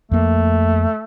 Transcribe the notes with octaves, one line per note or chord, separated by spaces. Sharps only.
F2 A3 A#3